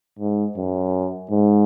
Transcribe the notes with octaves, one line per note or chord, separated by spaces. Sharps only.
G#2
F#2
G#2